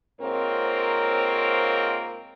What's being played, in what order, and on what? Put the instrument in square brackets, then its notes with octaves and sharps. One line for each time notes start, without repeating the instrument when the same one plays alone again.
[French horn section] G#2 A#3 C4 F4 A#4 C#5